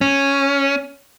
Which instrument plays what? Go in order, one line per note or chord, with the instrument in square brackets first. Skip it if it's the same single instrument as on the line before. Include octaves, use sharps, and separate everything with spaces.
[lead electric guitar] C#4